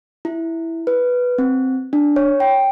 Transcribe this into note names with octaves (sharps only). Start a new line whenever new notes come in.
E4
B4
C4
D4
C#5
G5